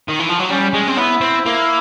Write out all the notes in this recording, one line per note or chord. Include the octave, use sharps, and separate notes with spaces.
D#3
E3
F3
F#3
G3 C#4
G#3
C4
B3 E4
C4
A#3 E4